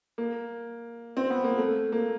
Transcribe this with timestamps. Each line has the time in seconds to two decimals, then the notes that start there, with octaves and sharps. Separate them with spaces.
0.18 A#3
1.17 C4
1.30 B3
1.44 A#3
1.58 A3
1.92 A#3